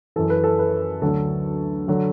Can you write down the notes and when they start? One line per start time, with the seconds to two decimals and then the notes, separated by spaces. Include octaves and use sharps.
0.16 F#2 E3 A4
0.30 B4
0.44 A4
0.59 B4
1.01 D2 D3 F#3 A4
1.88 D3 F#3